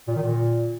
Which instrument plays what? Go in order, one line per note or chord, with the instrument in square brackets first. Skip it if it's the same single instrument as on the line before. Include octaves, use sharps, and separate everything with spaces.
[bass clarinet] A#2
D#3
A#2